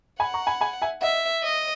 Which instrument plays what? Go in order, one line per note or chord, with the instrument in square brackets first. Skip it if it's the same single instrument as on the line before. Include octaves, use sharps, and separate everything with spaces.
[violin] F#5 [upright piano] G#5 B5
[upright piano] A#5 C#6
G#5 B5
G#5 B5
E5 G#5
[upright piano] D#5 F#5 [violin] E5
[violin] D#5